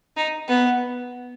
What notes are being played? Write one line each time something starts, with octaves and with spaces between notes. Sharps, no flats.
D#4
B3